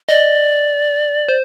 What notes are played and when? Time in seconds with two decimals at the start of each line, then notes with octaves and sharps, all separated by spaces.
0.09 D5 D#5
1.28 C5